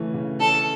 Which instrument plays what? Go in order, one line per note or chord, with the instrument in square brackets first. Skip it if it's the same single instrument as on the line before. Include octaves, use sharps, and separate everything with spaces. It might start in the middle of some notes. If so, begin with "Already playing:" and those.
Already playing: [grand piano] C#3 E3 A3 C#4
C#3
[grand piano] C#4 [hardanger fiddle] A4